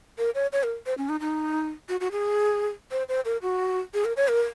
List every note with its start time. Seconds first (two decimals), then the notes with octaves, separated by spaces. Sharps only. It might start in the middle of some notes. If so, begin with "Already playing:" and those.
0.18 A#4
0.35 C#5
0.53 C#5
0.63 A#4
0.86 C5
0.98 C#4
1.09 D#4
1.20 D#4
1.89 F#4
2.00 F#4
2.12 G#4
2.91 C5
3.09 C5
3.25 A#4
3.42 F#4
3.94 G#4
4.05 A#4
4.17 C#5
4.28 A#4